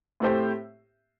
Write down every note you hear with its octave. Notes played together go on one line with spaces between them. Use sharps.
A2 A3 C4 G4 C5